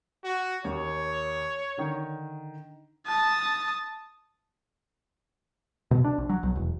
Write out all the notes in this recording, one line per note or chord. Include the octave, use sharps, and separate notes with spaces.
F#4
D#2 C#5
D3 D#3
A5 D#6
B2
D4
A#1
F#3
B1
E1